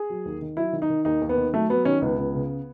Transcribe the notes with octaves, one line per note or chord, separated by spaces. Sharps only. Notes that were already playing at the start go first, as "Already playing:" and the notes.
Already playing: G#4
F#3
D#2
D#3
F#3 E4
D#3
D#4
D#3
D#2 D#4
D#2
B3
D#3
F#3 A3
F#3 B3
D#3 C#4
C#2 B3
C#2
C#3